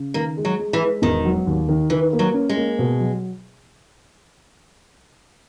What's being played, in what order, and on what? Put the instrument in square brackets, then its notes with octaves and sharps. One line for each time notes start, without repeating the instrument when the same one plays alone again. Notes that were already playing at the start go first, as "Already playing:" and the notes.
Already playing: [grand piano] C#3
[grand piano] D#3 [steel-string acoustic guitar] A#3
[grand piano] G#3
[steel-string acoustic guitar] F#3
[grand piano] G#3
[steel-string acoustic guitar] E3
[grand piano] G#3
[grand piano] E1 [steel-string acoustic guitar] D#3
[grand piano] F#3
D#2
D#3
[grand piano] D#3 [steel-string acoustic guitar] E3
[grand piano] A#3
[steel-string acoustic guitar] F#3
[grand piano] C#4
[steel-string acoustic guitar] G#3
[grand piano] A#3
B2
F#3